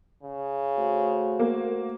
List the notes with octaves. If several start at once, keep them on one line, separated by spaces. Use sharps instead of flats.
C#3
A3 F#4 C5
A#3